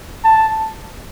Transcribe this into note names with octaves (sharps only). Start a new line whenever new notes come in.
A5